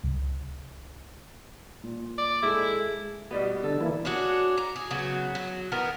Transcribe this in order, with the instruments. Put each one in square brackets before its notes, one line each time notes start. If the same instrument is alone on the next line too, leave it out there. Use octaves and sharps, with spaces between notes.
[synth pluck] C#2
[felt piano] A#2
[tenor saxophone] D5
[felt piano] G#3 A4 [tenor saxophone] E4
[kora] B2 G3 B3 [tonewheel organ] F#4
[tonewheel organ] D3 [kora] A4
[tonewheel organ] E3 A#3 E4
[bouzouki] D4 F#4 G#4 C#5
A#5
G#4
C#3 F#3 B3 F#4
F#3
D#3 E3 B3 A#4